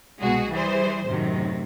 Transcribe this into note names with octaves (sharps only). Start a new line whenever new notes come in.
C2 B2 G#3 F#4 G#4
E3 G3 G#4 C5
F#2 A2 C3 D#3